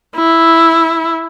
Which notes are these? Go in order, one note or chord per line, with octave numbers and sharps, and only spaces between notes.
E4